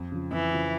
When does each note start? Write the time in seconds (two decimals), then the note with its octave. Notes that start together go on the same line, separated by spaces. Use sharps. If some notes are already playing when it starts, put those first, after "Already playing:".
Already playing: F2
0.12 C#3 F3
0.31 F2 E3
0.53 C#3 F3